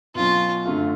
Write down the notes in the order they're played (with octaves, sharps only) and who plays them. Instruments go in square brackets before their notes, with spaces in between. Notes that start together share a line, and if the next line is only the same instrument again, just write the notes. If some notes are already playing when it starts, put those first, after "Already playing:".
[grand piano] B2 F#3 C#4 [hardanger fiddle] F4
[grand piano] F#2 D3 F#3 A3 F4